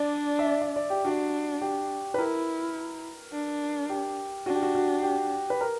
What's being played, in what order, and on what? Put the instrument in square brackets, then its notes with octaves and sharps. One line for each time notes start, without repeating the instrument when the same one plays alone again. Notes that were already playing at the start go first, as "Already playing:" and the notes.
Already playing: [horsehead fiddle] D4 [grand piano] D5
[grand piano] E5
D5
E5
D5
G4
[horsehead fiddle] D4 [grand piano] F#4
[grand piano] G4
B4
[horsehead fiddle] E4 [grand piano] A#4
[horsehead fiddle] D4
[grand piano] G4
[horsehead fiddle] D4 [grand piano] F#4
[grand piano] G4
F#4
F#4
G4
B4
A#4